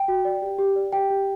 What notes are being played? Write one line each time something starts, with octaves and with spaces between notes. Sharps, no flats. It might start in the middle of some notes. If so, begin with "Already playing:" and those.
Already playing: G5
F#4
D5
G4
G4
D5
G4 G5
G4